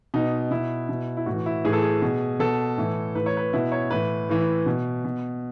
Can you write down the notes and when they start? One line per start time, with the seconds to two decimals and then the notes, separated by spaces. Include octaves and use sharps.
0.14 B2 D#4
0.51 B2 E4
0.89 B2
1.17 E4
1.26 A2 E3 F#4
1.46 E4
1.64 A2 E3 G#4
1.73 A4
1.82 G#4
2.02 B2
2.40 B2 A4
2.78 A2 E3
3.15 A2 E3 B4
3.26 C#5
3.37 B4
3.53 B2 E4
3.72 C#5
3.90 A2 E3 B4
4.29 A2 E3
4.66 B2
5.05 B2